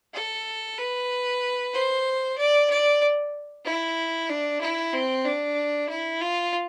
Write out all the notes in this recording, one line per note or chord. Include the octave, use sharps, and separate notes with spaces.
A4
B4
C5
D5
D5
E4
D4
E4
C4
D4
E4
F4